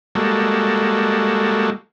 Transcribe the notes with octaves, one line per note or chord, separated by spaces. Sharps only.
G3 G#3 A#3 F#4 A4